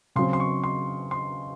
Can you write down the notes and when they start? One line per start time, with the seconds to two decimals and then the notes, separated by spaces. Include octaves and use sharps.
0.16 C#3 F#3 C4 C6
0.33 C6
0.40 C#6
0.64 C6
1.11 C6